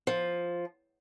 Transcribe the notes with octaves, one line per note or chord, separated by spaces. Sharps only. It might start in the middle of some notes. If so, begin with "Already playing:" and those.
F3